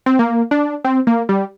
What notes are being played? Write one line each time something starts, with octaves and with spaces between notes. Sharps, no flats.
C4
A#3
D4
C4
A#3
G3